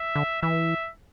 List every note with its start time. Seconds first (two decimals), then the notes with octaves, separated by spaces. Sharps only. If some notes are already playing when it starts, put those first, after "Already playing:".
Already playing: E5
0.16 D3
0.42 E3 E5